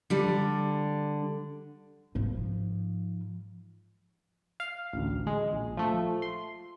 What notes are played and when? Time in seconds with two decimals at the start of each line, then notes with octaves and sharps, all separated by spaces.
0.10 D3 G3
2.15 G#2 F3
4.60 F5
4.93 A1 D2
5.27 G#3
5.53 A#1
5.77 F3 A3
6.22 C6